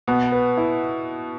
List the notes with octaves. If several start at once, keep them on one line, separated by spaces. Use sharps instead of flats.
B2 B3
B4
E4